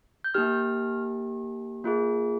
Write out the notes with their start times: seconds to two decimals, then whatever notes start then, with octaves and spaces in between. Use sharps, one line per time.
0.24 G6
0.34 A#3 D#4 G4 F6
1.84 A#3 F4 G#4